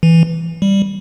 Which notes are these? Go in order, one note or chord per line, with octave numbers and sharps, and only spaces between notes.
E3
G3